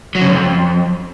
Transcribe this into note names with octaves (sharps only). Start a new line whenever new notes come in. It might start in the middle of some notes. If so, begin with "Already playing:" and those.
F#3
C#3
F#2
F2